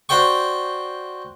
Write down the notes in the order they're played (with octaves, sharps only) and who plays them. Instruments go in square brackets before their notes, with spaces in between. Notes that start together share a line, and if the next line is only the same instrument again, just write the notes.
[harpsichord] F#4 C5 D5 G5 C#6